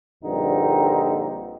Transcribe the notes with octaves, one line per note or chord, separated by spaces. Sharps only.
A#1 G2 D3 C4 D#4